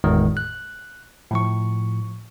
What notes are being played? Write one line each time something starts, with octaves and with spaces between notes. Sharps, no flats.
G1 E2 A2 D#3 G#3
F#6
A2 F3 C#6